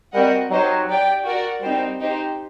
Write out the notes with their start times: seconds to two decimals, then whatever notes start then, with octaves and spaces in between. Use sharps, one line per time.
0.13 G3 C4 F#4 A#4 D#5 F#5
0.51 F#3 D#4 G4 C5 D#5
0.88 G4 D5 G5
1.25 F#4 A#4 D5 F#5
1.62 G3 C4 D#4 G4 C5
2.00 D#4 G4 C5